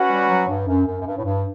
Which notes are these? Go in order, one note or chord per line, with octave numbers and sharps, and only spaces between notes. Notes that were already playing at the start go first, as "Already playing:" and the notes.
Already playing: C#4 F#4 B4 F#5
G3
F#3
G2
F#2
F#2
F#2
G2
A2
G2